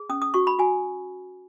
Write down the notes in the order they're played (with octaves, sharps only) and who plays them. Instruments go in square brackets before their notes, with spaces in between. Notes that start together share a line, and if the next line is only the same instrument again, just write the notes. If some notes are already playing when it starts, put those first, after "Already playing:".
Already playing: [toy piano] G#4
C#4 D#6
D#6
F#4 C#6
B5
F#4 G#5